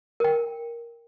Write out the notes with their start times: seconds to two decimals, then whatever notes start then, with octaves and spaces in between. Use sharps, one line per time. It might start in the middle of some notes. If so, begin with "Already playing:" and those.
0.20 A#4 G5